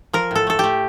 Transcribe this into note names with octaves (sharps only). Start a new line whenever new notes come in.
F3 A#4
A2 A4
A3 A4
A3 G4